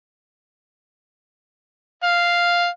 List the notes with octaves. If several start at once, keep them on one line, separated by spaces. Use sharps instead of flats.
F5